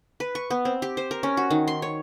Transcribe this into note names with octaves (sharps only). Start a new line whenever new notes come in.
B4
C#6
B3
C4
G4
C5
A#4
C#4
F#4
D#3
C6
C#5